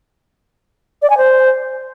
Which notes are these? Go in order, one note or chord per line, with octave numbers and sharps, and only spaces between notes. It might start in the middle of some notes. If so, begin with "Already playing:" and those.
D5
G#5
C5